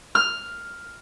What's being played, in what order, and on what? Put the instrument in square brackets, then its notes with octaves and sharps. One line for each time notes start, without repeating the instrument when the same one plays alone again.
[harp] F6